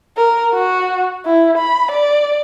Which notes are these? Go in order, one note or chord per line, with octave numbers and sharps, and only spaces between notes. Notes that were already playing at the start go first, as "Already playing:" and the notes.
A#4
F#4
E4
B5
D5